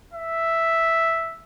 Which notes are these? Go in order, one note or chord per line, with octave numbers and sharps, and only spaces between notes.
E5